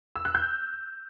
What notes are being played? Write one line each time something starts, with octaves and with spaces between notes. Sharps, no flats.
E6
F#6
G6